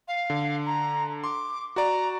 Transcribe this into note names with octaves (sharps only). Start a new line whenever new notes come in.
F5
D3
A#5
C6 D6
F#4 D5 A#5